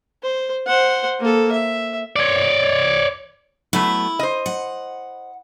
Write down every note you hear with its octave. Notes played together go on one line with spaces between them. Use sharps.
C5
C5 F#5
A#3 A4
E5
C#5 D5
F#3 A3 B3 E4
C5 D#5
F#5